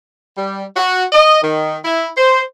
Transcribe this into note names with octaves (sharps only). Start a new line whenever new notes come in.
G3
F#4
D#5
D#3
E4
C5